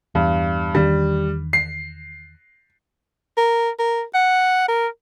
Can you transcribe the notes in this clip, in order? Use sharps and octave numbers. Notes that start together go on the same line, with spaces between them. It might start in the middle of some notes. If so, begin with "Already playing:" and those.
E2 G2
E2 D#3 G3 D4
C7
A#4
A#4
F#5
A#4